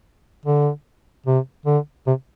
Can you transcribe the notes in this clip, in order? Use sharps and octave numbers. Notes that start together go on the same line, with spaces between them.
D3
C3
D3
C3